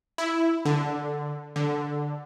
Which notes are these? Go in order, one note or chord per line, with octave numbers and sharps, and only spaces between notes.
E4
D3
D3